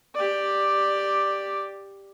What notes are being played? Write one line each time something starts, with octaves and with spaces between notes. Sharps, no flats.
G4 D5